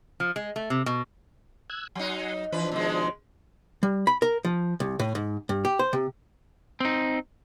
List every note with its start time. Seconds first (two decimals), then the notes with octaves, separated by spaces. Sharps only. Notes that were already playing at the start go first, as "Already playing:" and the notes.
0.20 F3
0.36 G#3
0.56 A3
0.70 C3
0.86 B2
1.70 E6 F#6 G#6
1.95 F#3 D#4 F#5 G#5 C6
2.52 E3 F3 D4 B4
2.72 B2 D#3 G#3
3.83 G3
4.07 B5
4.22 A#4
4.45 F3
4.80 C2
4.99 A2
5.15 G#2
5.49 G2
5.65 G4
5.79 C5
5.93 C3
6.80 C4 D#4